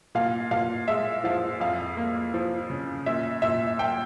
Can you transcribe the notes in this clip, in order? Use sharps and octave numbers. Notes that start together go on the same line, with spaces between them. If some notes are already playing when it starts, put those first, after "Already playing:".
A#2 F5
A#2 F5
G#3 E5
F3 F5
F2 F5
A#3
F3
C#3
A#2 E5
A#2 E5
A#3 G5